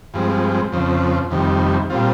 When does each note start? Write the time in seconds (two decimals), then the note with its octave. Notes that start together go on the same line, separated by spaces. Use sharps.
0.14 G2 F3 G#3 C4
0.72 F2 C#3 F3 C4
1.31 F2 C3 D#3 G3
1.90 A#2 G3 C4 F4